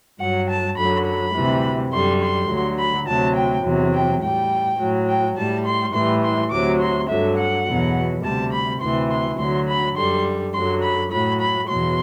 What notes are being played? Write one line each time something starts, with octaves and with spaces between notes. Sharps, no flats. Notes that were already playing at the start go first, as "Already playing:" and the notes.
G2 F#3 F#5
A5
F#2 D3 F#3 B5
B5
D2 C3 E3 G3
F#2 D3 G3 C6
C6
D2 D3 F#3
B5
D2 C3 F#3 A5
G5
E2 C3 F#3
G5
A2 G3 G5
A2 F#3
G5
A2 G3 A5
C6
A2 E3 G3 C6
C6
D2 C3 F#3 D6
C6
G2 D3 F#3 E5
F#5
E2 B2 F#3
D2 C3 G3 A5
B5
D2 C3 E3 C6
C6
D2 D3 F#3 C6
B5
F#2 D3 G3 C6
F#2 D3 F#3 C6
B5
A2 F#3 B5
B5
E2 B2 F#3 C6